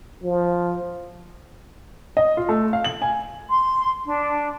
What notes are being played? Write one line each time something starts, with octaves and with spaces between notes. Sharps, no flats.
F3
D#5
F4
A3
F5
F#7
G#5
C6
D4